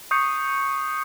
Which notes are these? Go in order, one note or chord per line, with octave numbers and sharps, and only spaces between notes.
C#6 D#6 G6 C7 C#7